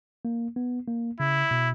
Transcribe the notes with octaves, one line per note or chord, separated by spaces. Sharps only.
A#3
B3
A#3
C#3 E4
B2